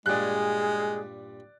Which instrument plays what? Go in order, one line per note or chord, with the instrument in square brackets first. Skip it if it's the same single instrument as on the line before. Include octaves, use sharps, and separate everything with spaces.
[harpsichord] G2 A#2 [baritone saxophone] G#3 [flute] G#4 [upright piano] D5 F#6